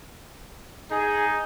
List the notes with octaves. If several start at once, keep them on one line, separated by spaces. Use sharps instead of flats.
D#4 G#4